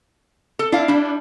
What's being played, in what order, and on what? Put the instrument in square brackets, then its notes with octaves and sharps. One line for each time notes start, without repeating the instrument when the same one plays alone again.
[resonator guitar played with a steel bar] A4
[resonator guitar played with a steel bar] D4 F5 [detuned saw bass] E4
[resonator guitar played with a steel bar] G3 E4 [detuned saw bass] D4